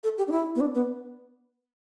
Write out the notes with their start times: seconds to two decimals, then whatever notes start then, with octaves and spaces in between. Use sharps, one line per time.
0.04 A4
0.18 G4
0.28 D4
0.32 E4
0.55 B3
0.60 D4
0.75 B3